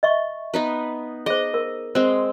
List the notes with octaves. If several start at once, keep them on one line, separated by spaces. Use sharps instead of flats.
D#5 E5 C#6
B3 D#4 B4
G#4 C5 D#5
A#4
G#3 C4 C5